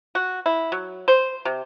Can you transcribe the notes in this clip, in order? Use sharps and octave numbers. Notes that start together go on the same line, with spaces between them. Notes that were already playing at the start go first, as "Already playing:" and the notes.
F#4
E4
F#3
C5
C3